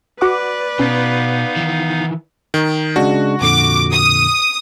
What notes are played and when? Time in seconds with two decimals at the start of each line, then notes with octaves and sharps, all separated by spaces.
0.21 F#4 B4 D5 F#5 D6
0.79 B2 B3 C#4 D#4 F5
1.56 D#3 E3
2.54 D#3
2.96 C#3 G#3 D4 F#4
3.41 F2 A#2 D3 D6
3.91 D#6